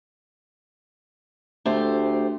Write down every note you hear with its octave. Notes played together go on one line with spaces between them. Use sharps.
D2 A3 G4 C5